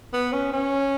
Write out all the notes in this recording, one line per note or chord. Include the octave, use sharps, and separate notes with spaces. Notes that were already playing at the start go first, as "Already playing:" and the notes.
B3
C#4
C#4